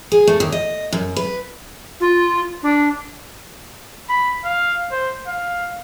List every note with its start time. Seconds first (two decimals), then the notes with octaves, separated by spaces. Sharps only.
0.12 G#4
0.27 A3
0.40 D#2
0.52 D#5
0.93 F#2
1.16 B4
2.00 F4
2.63 D4
4.09 B5
4.45 F5
4.91 C5
5.27 F5